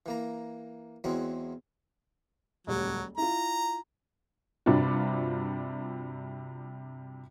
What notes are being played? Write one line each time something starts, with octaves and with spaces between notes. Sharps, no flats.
E3 A#3 A#5
E2 E3 F#3 G#3 C4
D#1 C#2 F#3 G4
E4 F4 A#5
G2 C3 D4 F4 F#4